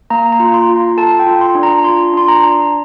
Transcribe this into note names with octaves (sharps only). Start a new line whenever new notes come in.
A#3 A#5
A#5
F4
C6
F4
A#5
A4 A5
G5
F4
C6
D4
A#5
F4 C6
D4 C6
A#5
D4